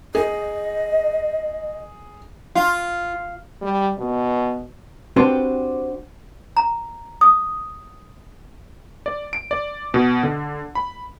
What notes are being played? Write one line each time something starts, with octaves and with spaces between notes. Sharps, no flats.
G#4 D#5
F4
G3
B2
C4 D4 F#4 G4 B4 C5
A#5
D#6
D5
D7
D5
B2
D3
B5